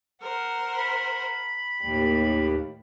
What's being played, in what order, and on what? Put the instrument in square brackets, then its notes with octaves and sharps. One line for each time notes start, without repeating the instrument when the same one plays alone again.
[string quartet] A#4 C5 F#5
[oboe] B5
[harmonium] D#2 [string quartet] A2 G3